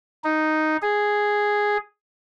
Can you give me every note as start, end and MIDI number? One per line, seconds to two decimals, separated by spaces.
0.24 0.77 63
0.82 1.77 68